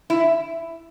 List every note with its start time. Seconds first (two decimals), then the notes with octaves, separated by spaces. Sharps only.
0.10 E4